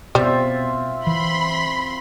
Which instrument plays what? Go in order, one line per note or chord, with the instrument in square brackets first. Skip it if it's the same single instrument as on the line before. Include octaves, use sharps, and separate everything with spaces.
[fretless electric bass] B2 [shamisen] G3 [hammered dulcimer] C4 F4 E5
[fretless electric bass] E3 [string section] B5 C6